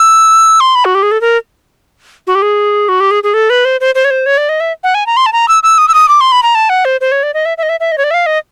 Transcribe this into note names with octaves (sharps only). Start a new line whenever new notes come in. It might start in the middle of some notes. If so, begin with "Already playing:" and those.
Already playing: E6
C6
B5
F#4
G4
G#4
A4
A#4
F#4
G4
G#4
F#4
G4
G#4
G#4
A4
B4
C5
C5
C5
C#5
C5
C#5
D5
D#5
E5
F#5
G#5
A#5
C6
A5
A#5
E6
E6
D#6
E6
D#6
D6
C6
B5
A#5
A5
F#5
C5
C5
C#5
D5
D#5
E5
E5
D#5
E5
E5
D#5
C#5
D5
E5
F5
D#5